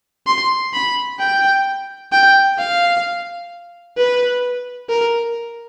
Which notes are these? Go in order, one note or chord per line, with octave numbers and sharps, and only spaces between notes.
C6
B5
G5
G5
F5
B4
A#4